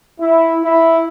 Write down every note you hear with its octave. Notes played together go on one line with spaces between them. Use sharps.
E4
E4